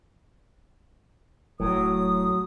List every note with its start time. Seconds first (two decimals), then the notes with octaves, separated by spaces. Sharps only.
1.60 D#1 A2 F#3 D#6